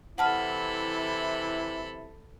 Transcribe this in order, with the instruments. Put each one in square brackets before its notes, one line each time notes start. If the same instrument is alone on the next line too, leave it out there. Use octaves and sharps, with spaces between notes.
[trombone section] C3 E3 E4 [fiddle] A4 B5 [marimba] F#5 A5 F6